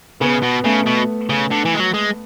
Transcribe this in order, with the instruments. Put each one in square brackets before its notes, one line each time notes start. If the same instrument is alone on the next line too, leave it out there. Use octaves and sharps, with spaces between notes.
[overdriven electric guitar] C#3 [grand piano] B3
[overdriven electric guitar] B2
[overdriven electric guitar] C#3 [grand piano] A3
[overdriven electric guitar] B2
C#3
D3
E3
G#3
F#3
G#3